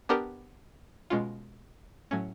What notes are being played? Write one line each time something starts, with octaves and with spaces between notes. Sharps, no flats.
B3 D4 G4 A#4
B2 G#3 C#4 F4
A2 F#3 A3 C#4